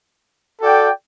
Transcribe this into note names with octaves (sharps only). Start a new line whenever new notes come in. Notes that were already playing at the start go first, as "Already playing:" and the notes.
F#4 A4 D5 G5